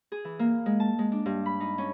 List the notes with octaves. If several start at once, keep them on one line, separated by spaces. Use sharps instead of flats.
G#4
E3
A#3
G#3
A5
G#3
D4
G2
B5
D#4
C#4